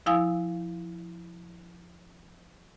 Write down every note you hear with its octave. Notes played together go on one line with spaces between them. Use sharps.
F3 E4 F5 G#5 D#6 E6